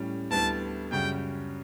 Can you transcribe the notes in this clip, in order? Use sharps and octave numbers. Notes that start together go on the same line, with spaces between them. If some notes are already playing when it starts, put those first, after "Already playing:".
Already playing: A2 G3 C#4
D2 D3 G3 B3 E4 A5
F#2 C#3 G3 C#4 F#4 G5